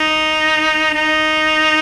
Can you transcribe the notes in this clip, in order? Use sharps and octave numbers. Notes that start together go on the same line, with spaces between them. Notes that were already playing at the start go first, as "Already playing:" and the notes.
Already playing: D#4
D#4